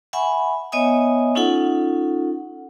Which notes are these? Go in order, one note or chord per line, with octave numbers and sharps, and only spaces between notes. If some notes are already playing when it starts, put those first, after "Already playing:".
E5 F#5 G#5 B5 C#6
B3 C#5 D#5 E5 G#5 D#6
C#4 D#4 F4 A4 F#5